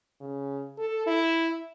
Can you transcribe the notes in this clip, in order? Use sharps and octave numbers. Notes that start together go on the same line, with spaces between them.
C#3
A4
E4